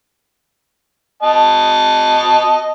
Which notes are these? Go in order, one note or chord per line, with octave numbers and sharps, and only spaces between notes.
D#5 A5